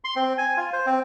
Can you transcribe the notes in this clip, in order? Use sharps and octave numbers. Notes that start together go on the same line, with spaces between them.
C6
C4
G#5
F4
C5
C4